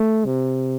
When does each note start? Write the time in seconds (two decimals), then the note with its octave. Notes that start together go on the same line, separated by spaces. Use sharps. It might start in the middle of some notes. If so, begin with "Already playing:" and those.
Already playing: A3
0.25 C3